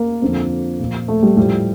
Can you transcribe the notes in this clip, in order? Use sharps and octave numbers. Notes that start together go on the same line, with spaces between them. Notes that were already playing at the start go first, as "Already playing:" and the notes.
Already playing: A#3
F2 D3 F3
A#2 F3
A3
G3
A2 F3 G3